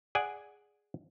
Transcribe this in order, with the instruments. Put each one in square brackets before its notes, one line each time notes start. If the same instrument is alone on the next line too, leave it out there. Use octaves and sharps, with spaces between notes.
[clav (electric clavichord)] G#4 D5 F#5 G#5